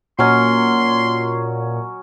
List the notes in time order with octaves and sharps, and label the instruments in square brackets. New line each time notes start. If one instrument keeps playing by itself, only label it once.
[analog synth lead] A#2 [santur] F#3 C#4 D#5 [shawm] C6